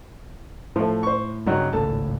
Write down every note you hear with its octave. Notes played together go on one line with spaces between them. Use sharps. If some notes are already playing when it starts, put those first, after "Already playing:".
A2 F3 A3
C5 C#6
G2 C#3 F#3 D#4
G#1 C#2 A2 A4 A5